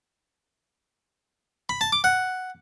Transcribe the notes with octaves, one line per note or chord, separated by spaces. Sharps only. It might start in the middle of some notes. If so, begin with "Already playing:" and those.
B5
A5
D6
F#5